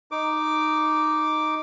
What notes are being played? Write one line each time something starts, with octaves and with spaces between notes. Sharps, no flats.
D#4 D6